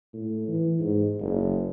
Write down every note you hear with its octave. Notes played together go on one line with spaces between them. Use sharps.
A2
E3
G#2
F#1